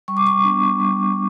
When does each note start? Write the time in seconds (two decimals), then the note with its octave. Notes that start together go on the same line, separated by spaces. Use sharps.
0.08 G3 C#6
0.17 D6
0.27 C#6
0.44 B3 D4
0.80 G3